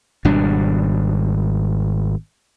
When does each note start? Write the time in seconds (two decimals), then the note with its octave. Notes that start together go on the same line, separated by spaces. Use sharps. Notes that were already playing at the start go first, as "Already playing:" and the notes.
0.25 G#1 B2 G3 D4